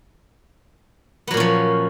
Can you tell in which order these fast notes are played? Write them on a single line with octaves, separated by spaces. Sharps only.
B3 F#3 A#2 C#4 F3